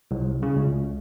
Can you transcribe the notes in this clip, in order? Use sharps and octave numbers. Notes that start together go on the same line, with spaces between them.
C2
C#3
C#2